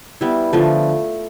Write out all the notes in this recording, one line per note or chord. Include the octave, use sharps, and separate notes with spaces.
G3 B3 E4
D3 F3 A3